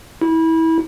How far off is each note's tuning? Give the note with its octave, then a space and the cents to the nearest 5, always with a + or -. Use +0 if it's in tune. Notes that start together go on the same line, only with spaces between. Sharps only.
E4 -25